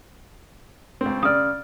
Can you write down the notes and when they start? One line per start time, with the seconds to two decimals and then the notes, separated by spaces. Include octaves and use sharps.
1.01 C#2 C4
1.23 C#3 D5 D#6 F6